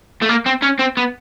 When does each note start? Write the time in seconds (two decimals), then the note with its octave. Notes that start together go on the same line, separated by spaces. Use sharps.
0.22 A3
0.29 A#3
0.46 C4
0.63 C#4
0.79 C4
0.97 B3